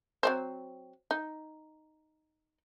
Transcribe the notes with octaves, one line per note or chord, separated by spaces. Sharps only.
F#3 C4 C5
D#4